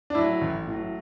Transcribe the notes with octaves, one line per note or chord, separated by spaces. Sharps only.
D4
A2 F#3 E4
A1
A2 F#3